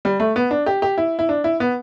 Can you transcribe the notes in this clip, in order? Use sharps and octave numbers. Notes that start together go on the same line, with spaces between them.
G3
A3
B3
D4
G4
G4
E4
E4
D4
E4
B3